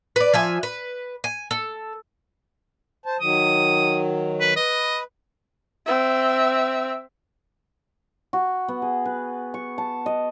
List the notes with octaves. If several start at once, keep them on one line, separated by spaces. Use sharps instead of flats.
B4 D5
F3 E5 G#5
B4
G#5
A4
C5 A5
D#3 F#3 D#6
B4
B4 D#5
C4 E5
F#4
B3
G#4
B4
C#6
A5
D#5